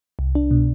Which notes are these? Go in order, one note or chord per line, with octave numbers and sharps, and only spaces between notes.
C2
D4
B2